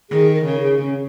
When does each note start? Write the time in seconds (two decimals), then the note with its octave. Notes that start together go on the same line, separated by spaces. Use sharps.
0.10 D#3 G#4
0.34 A#4
0.46 C#3
0.58 G#4
0.81 C#4